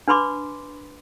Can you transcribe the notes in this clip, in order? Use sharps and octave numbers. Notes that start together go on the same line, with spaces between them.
D4 B4 B5 C6 D6